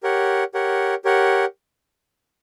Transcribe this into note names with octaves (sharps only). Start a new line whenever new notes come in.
G4 A#4 C#5 F#5
G4 A#4 C#5 F#5
G4 A#4 C#5 F#5